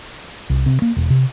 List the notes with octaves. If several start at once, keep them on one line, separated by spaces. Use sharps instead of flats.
C2
C3
A#3
E1
C3